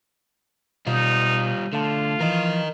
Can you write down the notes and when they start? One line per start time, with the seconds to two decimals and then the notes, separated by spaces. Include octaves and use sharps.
0.87 B2 G3 D#4 F4
1.73 D3 A3 F4 A5
2.20 E3 F3 A#4 D#5